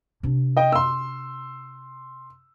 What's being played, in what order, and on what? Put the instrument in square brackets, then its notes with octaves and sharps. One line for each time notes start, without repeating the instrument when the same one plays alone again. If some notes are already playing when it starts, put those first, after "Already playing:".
[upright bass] C3 D4
[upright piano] D#5 G5
C6 E6